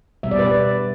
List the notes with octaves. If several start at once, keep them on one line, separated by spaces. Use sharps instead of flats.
B2 G3 E5
D5
B4
D5